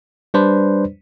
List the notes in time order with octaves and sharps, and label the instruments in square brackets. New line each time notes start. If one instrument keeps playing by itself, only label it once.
[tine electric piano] G3 D4 B4 C5 D5